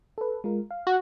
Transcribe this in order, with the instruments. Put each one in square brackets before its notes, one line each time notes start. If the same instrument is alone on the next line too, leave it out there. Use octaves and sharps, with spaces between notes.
[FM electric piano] A4 B4
G#3 F4 A#4
F5
[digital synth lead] F#4